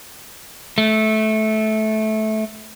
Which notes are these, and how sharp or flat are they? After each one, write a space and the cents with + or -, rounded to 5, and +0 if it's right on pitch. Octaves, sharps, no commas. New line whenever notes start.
A3 -15